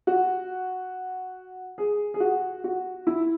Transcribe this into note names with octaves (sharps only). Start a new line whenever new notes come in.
F#4
G#4
G#4
F#4
F#4
E4